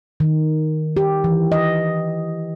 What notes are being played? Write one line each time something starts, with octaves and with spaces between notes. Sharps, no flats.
D#3
G4
E3
D#5